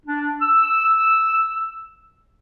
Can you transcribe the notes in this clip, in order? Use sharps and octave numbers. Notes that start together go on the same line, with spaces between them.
D4
E6